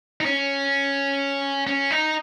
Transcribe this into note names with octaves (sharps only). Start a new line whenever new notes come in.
D#4
C#4
C#4
D#4